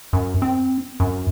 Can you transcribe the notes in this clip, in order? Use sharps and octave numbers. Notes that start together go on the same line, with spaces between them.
F#2
C4
F#2